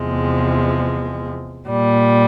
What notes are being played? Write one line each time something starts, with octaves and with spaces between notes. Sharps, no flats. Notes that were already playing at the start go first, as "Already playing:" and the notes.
Already playing: E2 C3 F3 G#3
A#2 G3